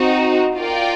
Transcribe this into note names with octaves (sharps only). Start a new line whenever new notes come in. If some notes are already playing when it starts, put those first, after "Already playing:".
Already playing: C4 D#4 F#4
F4 A#4 D5 G5